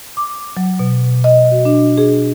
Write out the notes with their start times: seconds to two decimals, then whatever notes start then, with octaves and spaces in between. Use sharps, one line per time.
0.17 D6
0.57 F#3
0.79 B2
1.24 D#5
1.51 F#4
1.65 D4
1.98 G#4